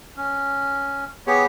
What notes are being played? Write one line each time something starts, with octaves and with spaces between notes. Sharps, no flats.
C#4
B3 G4 G#4 C#5